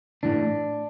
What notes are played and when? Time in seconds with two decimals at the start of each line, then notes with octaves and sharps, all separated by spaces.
0.23 A2 E3 D4